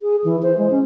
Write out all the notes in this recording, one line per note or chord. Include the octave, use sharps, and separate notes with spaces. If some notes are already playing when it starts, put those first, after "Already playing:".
G#4
E3
C5
G#3
C#4